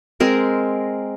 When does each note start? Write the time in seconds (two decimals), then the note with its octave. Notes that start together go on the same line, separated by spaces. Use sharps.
0.20 G#3 C4 A#4